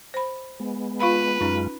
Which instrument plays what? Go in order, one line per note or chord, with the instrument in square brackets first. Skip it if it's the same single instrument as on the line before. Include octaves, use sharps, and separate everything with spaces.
[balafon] C5 B5
[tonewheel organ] G#3 B3
[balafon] F4 F5 B5 [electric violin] B4
[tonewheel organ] F#2 G#3 F4 [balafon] C#4 D#4